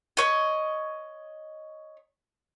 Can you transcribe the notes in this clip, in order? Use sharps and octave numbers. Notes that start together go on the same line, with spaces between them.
C#5 D#5